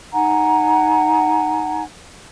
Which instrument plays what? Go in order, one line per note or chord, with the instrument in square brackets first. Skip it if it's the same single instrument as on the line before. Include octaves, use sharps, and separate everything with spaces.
[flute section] D#4 F#5 G#5 A#5